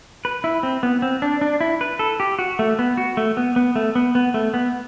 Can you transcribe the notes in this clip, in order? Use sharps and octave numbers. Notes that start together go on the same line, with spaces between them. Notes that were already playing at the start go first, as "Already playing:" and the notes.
B4
E4
C4
B3
C4
D4
D4
E4
B4
A4
G4
F#4
A3
B3
F#4
A3
B3
B3
A3
B3
B3
A3
B3